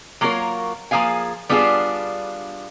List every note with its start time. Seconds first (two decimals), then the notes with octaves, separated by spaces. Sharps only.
0.21 F#3 A#3 F4 A4 A#4 C#5
0.91 F3 A#3 G#4 F5 G#5
1.49 G3 B3 D4 F4 G#4